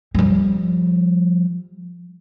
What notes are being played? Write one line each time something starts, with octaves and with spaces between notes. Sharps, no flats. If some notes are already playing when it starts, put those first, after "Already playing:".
F3 G3